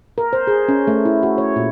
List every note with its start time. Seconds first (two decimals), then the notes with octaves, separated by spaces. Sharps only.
0.18 A#4
0.33 C5
0.47 G#4
0.68 C#4
0.87 A3
1.05 E4
1.23 F#4
1.38 C#5
1.56 A#2